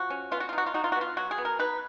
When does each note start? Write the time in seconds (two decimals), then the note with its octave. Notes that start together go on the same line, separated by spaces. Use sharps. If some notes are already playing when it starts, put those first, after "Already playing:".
Already playing: F3 F#4
0.10 C#4
0.31 B3 F4
0.40 F#4
0.49 F4
0.53 D#4
0.58 F#4
0.66 F4
0.74 D#4 F#4
0.84 F4
0.92 B3 F#4
1.01 F4
1.17 F#3 F#4
1.31 G#4
1.38 B3
1.45 A#4
1.59 D#4 B4